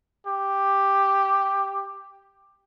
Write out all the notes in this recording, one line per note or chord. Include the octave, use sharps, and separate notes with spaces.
G4